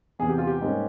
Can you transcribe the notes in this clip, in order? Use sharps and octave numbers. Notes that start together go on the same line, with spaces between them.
E2 C3 E3 G#4
G4
F4
G4
G#2 G3 A#3 C#4